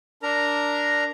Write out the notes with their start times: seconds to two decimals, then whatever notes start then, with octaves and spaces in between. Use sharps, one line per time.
0.23 D4 A#4 A#5